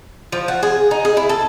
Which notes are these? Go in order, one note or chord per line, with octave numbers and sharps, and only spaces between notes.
F3
F#4
G#4
D#4
G#4
E4
A4